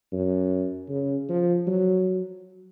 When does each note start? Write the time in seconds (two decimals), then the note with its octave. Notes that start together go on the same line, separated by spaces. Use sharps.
0.13 F#2
0.89 C#3
1.29 F3
1.67 F#3